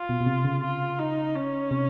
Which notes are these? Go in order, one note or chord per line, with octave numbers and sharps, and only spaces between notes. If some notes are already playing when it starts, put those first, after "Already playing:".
Already playing: F4
B2
B2
C3
C#3
F4
D#4
C#4
C3